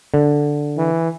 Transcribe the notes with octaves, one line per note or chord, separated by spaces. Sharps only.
D3
E3